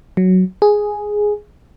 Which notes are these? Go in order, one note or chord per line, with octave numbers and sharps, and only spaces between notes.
F#3
G#4